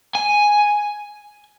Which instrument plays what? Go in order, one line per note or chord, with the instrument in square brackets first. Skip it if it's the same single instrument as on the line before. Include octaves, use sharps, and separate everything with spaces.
[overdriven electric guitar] G#5